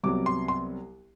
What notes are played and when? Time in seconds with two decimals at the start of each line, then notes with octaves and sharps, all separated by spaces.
0.04 C2 C3 F#3 B3 D6
0.26 C6
0.48 C6